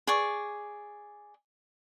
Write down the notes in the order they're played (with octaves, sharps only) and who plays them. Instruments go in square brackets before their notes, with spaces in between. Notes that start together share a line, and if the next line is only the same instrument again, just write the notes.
[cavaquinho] G#4 D5 C#6